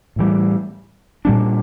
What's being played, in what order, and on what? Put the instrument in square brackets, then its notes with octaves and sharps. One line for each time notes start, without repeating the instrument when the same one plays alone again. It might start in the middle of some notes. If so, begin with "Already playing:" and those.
[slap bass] A2 E3 G3
A#2 G3 A#3 D4